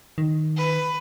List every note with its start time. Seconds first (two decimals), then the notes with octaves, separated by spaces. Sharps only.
0.18 D#3
0.57 B4